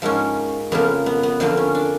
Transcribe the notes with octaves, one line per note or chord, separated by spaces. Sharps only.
G#2 F3 A#3 C#4
F2 C#3 F3 A#3 B3
B3
B3
F2 D3 F3 A#3 C4
C#4
D4